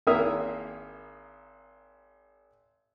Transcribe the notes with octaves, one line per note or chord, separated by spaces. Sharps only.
G#1 A#3 E4 E5 D#6 F6